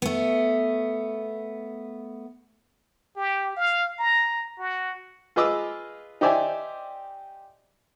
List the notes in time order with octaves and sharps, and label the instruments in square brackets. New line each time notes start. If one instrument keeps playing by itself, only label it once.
[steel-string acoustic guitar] A3 B3
[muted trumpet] G4
F5
A#5
F#4
[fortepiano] F4 G#4 B4 D#5 D6 E6
D#4 G4 C5 D5 E5 G#5